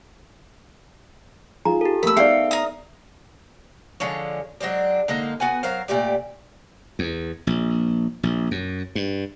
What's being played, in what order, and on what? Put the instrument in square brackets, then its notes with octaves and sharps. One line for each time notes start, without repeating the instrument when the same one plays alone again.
[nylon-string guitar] D#4 F4 G#4 [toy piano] A#5
[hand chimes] G4 A4
[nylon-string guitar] A3 A#3 [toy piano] A#4 [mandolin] B5 E6
[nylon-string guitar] B3 D#4 [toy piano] G#4 D5 [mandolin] A4 F5 G5 [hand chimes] E5
[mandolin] A#4 D#6
[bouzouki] D3 F3 G#3 C#5
F#3 G#3 C4 D4
D3 G#3 A#3 D#4
B3 F#4 F#5 G#5
F#3 A#4 C5 F5
A#2 A3 G4 D5
[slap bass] E2
A#1
A#1
F#2
G2